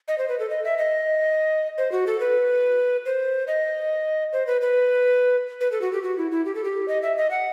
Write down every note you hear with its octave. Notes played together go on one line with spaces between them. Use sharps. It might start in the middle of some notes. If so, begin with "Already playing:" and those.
D#5
C5
B4
A4
D#5
E5
D#5
C5
F#4
A4
B4
C5
D#5
C5
B4
B4
B4
A4
F#4
G4
F#4
E4
E4
G4
A4
G4
D#5
E5
D#5
F#5